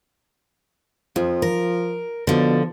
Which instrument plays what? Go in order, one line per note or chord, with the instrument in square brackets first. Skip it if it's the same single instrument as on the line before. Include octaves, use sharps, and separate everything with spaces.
[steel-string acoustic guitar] F2 [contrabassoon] F3
[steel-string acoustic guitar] A#4
[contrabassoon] B2 [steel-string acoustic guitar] D3 F3